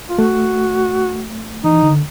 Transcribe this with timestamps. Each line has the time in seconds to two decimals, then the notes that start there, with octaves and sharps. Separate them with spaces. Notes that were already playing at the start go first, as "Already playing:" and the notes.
0.09 F4
0.18 A3 F#4
1.64 E3 D#4
1.83 D3